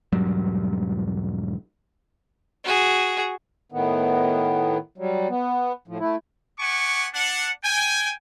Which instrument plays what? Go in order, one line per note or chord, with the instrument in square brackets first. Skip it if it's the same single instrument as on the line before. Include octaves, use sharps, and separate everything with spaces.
[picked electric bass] E1 G#2 F#3 G3
[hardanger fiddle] F#4 G#4
[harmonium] A2 D#3 B3
F#3 G3
B3
A2 F3
A3 E4
[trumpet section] B3 F#5 G#5 C#6 D6
D4 F#5
G5 G#5